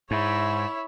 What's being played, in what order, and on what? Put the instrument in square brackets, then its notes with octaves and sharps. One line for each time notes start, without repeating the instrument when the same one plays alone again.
[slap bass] G#2 [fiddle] E4 [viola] C#5 E5